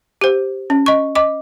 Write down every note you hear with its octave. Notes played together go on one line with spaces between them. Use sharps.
G4 C5
C#4
D#5 C#6
D#5 D6